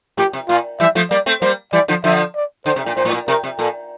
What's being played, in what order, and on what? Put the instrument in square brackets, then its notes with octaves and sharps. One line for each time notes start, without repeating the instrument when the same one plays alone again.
[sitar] A2 [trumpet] G4
[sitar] C3
[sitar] A#2 [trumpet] F4
[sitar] E3 G3 [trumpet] E5
[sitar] F3 A3
[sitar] G3 A#3 [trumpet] D5
[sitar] A3 C4
[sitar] G3 A#3 [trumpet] C5
[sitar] E3 G3 [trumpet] D5
[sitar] D3 F3
[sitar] D3 F3 [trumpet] E5
[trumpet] D5
[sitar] D3 [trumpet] C5
[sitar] C3
A#2
[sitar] A#2 [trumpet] C5
[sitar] A2
A#2
[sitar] C3 [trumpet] A#4
[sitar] C3
[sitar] A#2 [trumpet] A4